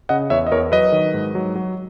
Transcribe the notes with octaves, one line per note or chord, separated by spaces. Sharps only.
C#3 D#5 F#5
E2 C#5 E5
D#5
E2 A#4 C#5
F#3 B4 D#5
D#3
G#2
F#3
F#3